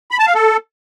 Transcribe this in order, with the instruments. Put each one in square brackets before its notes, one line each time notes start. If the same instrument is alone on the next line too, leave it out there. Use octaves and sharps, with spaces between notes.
[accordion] B5
A5
F5
A4